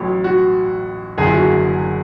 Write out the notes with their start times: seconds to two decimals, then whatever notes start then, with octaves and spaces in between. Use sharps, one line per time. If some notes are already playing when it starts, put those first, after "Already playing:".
Already playing: A1 A2 F#3
0.24 F#4
1.18 F#1 E2 D3 G#4
1.26 E4
1.33 F#4